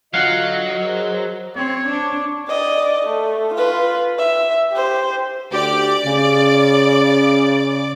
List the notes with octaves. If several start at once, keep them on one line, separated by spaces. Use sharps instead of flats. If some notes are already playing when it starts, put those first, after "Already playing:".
D3 F#3 F4 D#5 F5 F#5
G#4 A#4 C5
C4 C#5
D4
D5 D#5
A3
F4 B4
E5
G4 C5
D2 G4 D5 D6
C#3